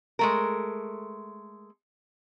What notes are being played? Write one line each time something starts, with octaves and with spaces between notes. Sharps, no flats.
G#3 A3 A#4